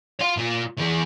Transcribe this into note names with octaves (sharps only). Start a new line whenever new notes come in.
F5 C6
A#2 F4
E3 G#4